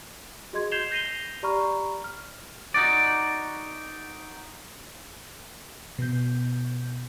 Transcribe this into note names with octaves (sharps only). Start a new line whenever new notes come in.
F#4 G#4 D#5 C6 G#6
G6 G#6 C7 E7 F7 G7
G6 A#6 C7 D#7 F7 G7
G4 D5 A#5 B5 C#6 F6
F6
D#4 F#4 D5
B2 G6